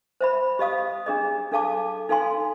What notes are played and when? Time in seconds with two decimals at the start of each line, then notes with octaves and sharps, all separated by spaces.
0.21 C5 E5 B5
0.59 G4 D#5 F5 D#6
1.06 D4 G#4 D#5
1.52 D4 A4 F5 A5 D6
2.09 D#4 A4 F5 G#5 C6